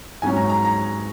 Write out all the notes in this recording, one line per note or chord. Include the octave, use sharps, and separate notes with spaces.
G#2 F#3 C#4 G#5
A#5
A#5
A#5